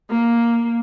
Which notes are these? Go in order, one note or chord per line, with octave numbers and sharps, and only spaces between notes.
A#3